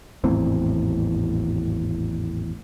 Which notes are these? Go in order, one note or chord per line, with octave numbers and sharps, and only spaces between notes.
G#1 E2 A2 C4